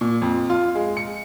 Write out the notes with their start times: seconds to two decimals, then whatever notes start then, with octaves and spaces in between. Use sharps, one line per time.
0.01 A#2
0.22 F2
0.50 F4
0.75 G#3
0.97 C#7